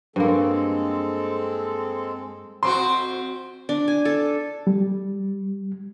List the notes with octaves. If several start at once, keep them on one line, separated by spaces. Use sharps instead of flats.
G2 G#3 A#3 C4 A4
F2 C4 F#4 C6
D4
G#5
A4
G3